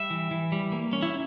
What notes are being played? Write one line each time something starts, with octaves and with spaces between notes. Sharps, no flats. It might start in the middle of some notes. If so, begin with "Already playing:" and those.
Already playing: G3 E5
E3
E3
G3
A#3
C#4
E4